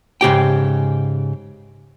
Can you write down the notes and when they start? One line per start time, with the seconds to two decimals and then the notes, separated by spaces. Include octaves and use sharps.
0.21 G#2 C#3 G4 G5